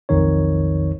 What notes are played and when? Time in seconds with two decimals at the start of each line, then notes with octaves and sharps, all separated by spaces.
0.09 B1 F2 D#3 D#4 C#5